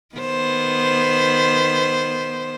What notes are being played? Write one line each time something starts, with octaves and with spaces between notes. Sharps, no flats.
D#3 B3 C5